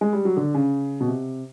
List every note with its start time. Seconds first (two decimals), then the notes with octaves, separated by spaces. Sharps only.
0.01 G#3
0.13 G3
0.25 F#3
0.37 D3
0.54 C#3
1.00 B2
1.08 C3